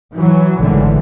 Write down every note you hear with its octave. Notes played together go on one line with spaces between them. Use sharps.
E3 F#3
G#1 A2 D3 E3